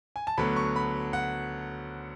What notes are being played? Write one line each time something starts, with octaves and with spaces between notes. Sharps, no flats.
G#5
A5
D2 D3 F#3 B3 B5
C#6
B5
F#5